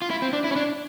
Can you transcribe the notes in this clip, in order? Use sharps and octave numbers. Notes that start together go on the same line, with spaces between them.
F4
E4
C4
D4
E4
C#4
D4